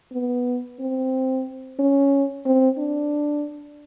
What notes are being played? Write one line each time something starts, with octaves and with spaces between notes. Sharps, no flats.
B3
C4
C#4
C4
D4